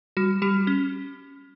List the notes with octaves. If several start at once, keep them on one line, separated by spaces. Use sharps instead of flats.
G3 F#4
G3 G4
C#4